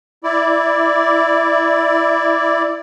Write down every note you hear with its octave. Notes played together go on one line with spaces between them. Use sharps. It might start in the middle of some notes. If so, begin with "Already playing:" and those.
E4 D5